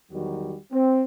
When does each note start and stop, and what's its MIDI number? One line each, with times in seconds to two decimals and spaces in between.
0.11 0.56 40
0.11 0.56 51
0.11 0.56 54
0.11 0.56 55
0.11 0.56 66
0.72 1.03 60